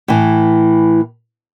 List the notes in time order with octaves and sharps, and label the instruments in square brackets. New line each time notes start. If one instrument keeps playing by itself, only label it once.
[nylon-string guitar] A2 E3